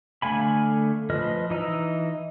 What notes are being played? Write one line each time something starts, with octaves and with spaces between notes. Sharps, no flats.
D3 A3 F5 G#5 B5
F3 B4 D#5 F6
E3 D#4 D#5 A#5 E6